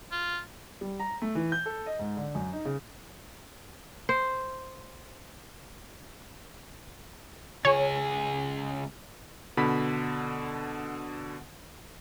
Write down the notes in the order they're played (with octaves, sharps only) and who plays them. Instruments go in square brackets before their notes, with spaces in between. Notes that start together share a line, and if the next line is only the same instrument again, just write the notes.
[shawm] F4
[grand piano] G3
A#5
A3
E3
G6
A4
D#5
G#2
D3
F#2
D#4
C#3
[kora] C5
[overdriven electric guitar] C#2 G#4 [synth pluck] C#5
[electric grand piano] B2 D3 B5 B6